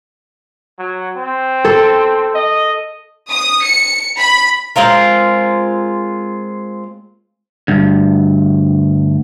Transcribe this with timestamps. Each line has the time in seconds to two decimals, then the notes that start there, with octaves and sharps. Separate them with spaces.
0.79 F#3
1.17 C4
1.65 A4
2.35 D#5
3.32 D#6
3.64 C#7
4.16 B5
4.76 G#3 C4 F4 A#4
7.68 D2 G2